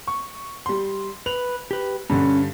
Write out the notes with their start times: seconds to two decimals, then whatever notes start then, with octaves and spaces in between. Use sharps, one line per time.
0.07 C#6
0.66 G3 C6
1.26 B4 F7
1.71 G4 B4
2.10 G2 D3 C#4